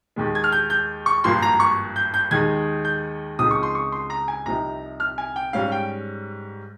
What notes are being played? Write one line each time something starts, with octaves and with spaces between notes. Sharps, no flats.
D#2 D#3 G#3
G#6
F6
G6
G6
C#6
G#1 G2 F3 A#3 C6
A#5
C#6
G6
G6
D#2 D#3 G#3 D#4 G#6
G6
C#2 C#3 F3 C4 D#4 D#6
C#6
C6
C#6
C6
A#5
G#5
C2 C3 F3 C4 D#4 A#5
F6
G#5
G5
G#2 G3 C#4 F5
G5